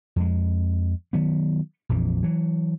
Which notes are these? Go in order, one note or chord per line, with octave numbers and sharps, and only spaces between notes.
F2 G#3
D#3 F#3 B3
A#1 F2 E3
E3 F#3